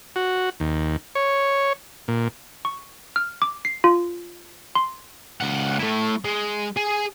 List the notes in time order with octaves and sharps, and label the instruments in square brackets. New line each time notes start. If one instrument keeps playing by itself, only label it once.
[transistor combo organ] F#4
D#2
C#5
A#2
[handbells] C#6
F6
D6
C7
F4
C6
[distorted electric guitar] C#2 F#5
A3 E4
G#3
G#4